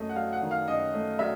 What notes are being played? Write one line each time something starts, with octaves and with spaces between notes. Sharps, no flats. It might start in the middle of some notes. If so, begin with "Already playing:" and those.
Already playing: F#2 A3 D#5
F#5
F#3 F5
F#5
D#3
F5
F#2 D#5
A3
F#3 E5